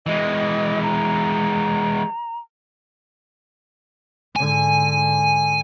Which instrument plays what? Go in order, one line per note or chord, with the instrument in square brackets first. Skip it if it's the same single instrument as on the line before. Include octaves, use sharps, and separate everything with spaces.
[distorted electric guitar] E3 G#3 [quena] D#5
[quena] A#5
[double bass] G#2 D3 [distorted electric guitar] G#5